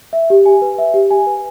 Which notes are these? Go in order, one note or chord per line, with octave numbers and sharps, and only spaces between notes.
E5
G4
G#5
B4
E5
G4
G#5
B4